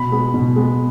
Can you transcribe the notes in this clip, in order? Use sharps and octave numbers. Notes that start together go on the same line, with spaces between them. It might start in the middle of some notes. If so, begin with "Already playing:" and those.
Already playing: B2 B5
G#3 B3
B2
G#3 B3